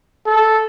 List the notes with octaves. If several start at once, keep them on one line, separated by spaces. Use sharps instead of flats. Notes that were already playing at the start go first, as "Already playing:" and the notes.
A4